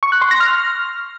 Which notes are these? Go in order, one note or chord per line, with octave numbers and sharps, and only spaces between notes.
C#6
F#6
C6
A#6
F6